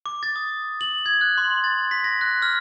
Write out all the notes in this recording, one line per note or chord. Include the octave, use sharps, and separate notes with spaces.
D6
A6
D#6
F#7
G#6
F#6
C6
A6
B6
A#6
F#6
F6